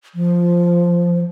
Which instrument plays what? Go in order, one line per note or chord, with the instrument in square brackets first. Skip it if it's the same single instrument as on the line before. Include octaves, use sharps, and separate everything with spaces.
[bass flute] F3